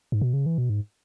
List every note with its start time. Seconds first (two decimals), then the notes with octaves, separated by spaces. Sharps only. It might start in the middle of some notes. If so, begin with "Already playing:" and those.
0.12 G#2
0.21 B2
0.33 C#3
0.46 E3
0.58 B2
0.70 G#2